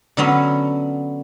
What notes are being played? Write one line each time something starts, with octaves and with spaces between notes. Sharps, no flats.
D3 F#3 B3 C#4